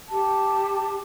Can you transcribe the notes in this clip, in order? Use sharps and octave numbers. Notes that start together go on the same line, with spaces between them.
G4 A5